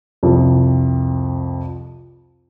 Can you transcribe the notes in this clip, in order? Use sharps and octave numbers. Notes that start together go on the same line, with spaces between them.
C2 F2